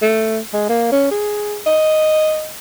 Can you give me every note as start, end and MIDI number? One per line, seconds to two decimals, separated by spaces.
0.02 0.39 57
0.53 0.66 56
0.69 0.89 58
0.92 1.07 61
1.11 1.58 68
1.66 2.50 75